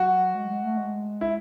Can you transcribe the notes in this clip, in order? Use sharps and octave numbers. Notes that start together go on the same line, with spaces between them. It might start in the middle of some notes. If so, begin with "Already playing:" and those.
Already playing: F#3 F#4
G#3
G#3
A3
G#3
E4